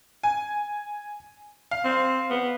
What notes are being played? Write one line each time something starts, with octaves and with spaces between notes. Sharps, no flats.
G#5
F5
C4
B3